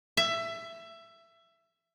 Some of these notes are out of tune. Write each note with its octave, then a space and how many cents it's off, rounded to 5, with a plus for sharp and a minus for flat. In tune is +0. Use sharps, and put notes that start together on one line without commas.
E5 +20